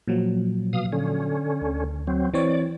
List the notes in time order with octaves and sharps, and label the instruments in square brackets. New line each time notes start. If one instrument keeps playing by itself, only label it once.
[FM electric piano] A#2 F3 F#3
[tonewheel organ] B2 F5 D#6
D3 C#4
[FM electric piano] D2
[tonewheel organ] F#3 C4
[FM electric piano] E3 C4 C#5 [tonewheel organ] D5